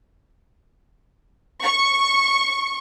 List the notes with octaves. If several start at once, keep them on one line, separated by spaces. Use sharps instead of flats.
C#6